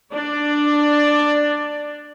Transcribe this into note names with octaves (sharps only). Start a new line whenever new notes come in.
D4 D5